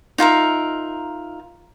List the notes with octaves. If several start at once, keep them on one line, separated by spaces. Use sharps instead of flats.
D#4 F4 A#4 E5